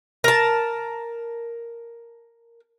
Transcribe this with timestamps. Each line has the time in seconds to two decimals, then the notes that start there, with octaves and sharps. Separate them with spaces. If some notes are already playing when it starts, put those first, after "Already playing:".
0.24 A#4 A5